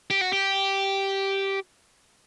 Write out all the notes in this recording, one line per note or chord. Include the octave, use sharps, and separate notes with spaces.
G4
F#4
G4